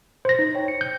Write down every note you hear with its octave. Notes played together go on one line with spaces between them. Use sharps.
C5 A#6
D#4
C#5 G5
C#7
G6